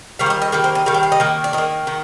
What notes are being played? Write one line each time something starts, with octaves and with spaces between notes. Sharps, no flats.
D#3 G3 F5
D5
D#5
D#5
D#3 G3 A#3
C5
D#5
D#3 G3 F5
G5
F5
D#5
D#3 A#3
D5
D#3 A#3 D#5
D#3